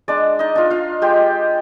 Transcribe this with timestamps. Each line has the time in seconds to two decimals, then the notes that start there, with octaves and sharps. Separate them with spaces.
0.08 G#3 D4 D5
0.39 D#4 D#5
0.56 D4 F4
0.70 F4 F5
1.02 G#3 G4 G5